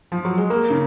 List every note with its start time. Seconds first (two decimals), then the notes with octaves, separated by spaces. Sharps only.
0.12 F3
0.25 F#3
0.37 G#3
0.50 A#3
0.70 C#3